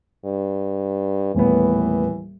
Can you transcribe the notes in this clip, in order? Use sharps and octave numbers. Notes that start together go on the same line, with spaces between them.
G2
D#1 A2 E3 B3